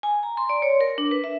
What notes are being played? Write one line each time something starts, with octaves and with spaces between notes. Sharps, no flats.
G#5
A#5
C6
D5
C#5
A#4
D4
B4
E5